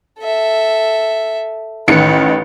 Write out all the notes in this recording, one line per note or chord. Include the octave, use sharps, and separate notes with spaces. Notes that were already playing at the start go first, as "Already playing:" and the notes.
A4 E5
A1 D#3 B4 C#7